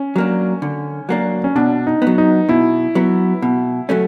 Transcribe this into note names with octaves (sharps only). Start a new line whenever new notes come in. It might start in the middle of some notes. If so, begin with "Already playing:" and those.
Already playing: C#4
F#3 A#3 D4
D3
F#3 A#3 D4
C#4
B2 D4
D#4
F#3 B3
D#4
B2 E4
F#3 B3
B2
F#3 A3 C#4